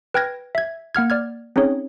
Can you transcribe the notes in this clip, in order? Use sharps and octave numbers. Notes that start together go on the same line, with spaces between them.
B4 G5 F6 G#6 A#6
E5 G#6
A#3 F#5 F6 G#6
D5 F6 G#6
C4 C#4 D#4 G#4 C#5